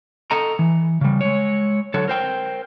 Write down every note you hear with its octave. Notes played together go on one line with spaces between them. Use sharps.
A4 D#5 A#5
E3
C#3 G3
G#3 C#5
D3 F#3 A4 C#5
A#4 C5 G5